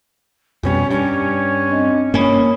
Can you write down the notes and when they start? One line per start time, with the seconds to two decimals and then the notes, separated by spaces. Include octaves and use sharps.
0.63 F2 B2 G3 C#4
0.91 G2 C#4
1.68 C4 D4 D#5
2.14 G2 A#3 C#4 C#5 B5 D#6